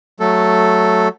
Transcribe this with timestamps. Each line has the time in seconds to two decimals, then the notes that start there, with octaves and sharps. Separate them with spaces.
0.20 F#3 A3 A4